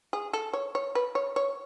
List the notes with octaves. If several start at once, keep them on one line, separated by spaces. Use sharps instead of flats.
G#4
A4
C#5
C#5
B4
C#5
C#5